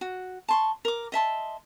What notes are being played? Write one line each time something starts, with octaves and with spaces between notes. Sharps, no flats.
F#4
A5 C6 C#6
A#4 D6
D#5 E5 A5 C6